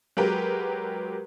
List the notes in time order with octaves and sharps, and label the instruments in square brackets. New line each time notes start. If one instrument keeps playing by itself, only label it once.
[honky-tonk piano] F#3 G#3 G4 A#4 B4